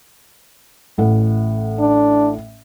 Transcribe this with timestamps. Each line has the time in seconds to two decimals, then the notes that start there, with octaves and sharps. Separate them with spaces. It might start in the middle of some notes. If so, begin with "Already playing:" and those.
0.98 A1 A2 F#5
1.80 D4